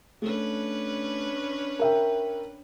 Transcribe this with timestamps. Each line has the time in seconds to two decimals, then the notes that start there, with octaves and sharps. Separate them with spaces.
0.22 A3 C#4 D4 B4
1.79 A#4 E5 G5